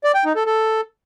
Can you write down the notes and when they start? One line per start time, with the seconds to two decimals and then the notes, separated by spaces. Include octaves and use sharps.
0.04 D5
0.14 G5
0.25 D#4
0.35 A4
0.46 A4